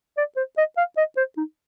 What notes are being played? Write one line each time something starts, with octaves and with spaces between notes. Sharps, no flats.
D5
C5
D#5
F5
D#5
C5
D#4